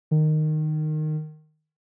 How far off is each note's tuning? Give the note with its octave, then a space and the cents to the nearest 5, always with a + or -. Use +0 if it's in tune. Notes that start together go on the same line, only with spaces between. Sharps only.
D#3 -15